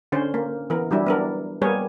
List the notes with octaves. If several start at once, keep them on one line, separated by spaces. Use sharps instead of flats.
D3 C#4 C5
A#3
E3 B3 A#4
F#3 G3 D4 E4
B3 D4 A#4
G3 A#3 B3 G#4 A#4 C#5